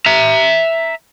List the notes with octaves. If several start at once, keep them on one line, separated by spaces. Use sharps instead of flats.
E5 A#5